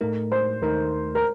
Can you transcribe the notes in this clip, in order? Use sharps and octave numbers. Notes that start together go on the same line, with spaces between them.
A2 A3 D#4 A#4
C5
D#2 D#3 A3 D#4 A#4
A#4